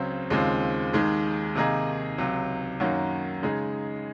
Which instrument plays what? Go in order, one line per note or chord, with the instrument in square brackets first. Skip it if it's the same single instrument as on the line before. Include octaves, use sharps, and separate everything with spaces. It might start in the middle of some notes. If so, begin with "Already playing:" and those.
Already playing: [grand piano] C#2 C#3 F#3 C4
D#2 C#3 G#3 C4 F4
D#2 D#3 G#3
C3 D#3 A#3 D#4 G#4
C#2 C3 F#3
F#2 D#3 A#3 C#4 F#4
C#3 G#3 D#4 G#4